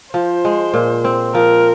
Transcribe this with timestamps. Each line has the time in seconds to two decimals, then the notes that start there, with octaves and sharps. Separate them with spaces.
0.14 F3 C5
0.45 G#3
0.74 A#2
1.04 C4
1.34 F3 A#4